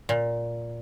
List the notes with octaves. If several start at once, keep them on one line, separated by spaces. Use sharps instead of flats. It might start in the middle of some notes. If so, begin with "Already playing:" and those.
A#2